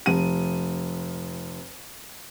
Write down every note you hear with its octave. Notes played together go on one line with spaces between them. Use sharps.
F1 D#7